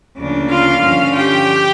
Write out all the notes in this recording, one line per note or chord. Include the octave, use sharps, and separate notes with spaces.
D2 C#3 F3 A#3 D4
F4 F5
G2 D3 F3 C#4 F4
G4 G5